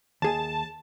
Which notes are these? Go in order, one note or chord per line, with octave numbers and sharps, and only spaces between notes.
D#2 G#4 G#5 A5